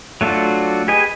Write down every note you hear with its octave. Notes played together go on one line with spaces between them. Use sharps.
F#3 A3 D4 F4 F#4
G4 G#4 B4 D#5 G#5